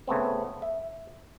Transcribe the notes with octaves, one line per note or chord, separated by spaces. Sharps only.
C#3 A3 B3 C4
E5